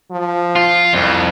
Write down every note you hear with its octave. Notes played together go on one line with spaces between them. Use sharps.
F3
F4
C2 F2